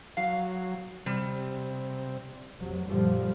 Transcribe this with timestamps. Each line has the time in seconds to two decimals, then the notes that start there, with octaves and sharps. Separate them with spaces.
0.17 F#3 F5
1.06 C3 G3
2.59 F1 C3 F#3
2.88 F#2 A#2 D3 F3 G3